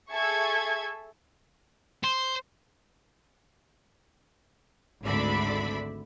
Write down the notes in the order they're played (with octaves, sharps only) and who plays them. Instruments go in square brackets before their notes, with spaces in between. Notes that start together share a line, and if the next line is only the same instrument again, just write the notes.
[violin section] G#4 A4 E5 C#6 G#6
[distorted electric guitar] C5
[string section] G#1 D2 D3 D5 E5 B5